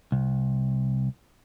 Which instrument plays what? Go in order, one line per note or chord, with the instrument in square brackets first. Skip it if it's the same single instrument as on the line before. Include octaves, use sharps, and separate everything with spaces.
[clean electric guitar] C2